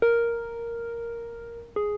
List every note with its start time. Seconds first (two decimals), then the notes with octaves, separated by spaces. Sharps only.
0.02 A#4
1.76 G#4